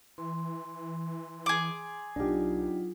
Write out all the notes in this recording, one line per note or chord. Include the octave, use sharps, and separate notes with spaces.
E3 C6
G#4 D6
B1 F#3 D4 D#4 F4 G4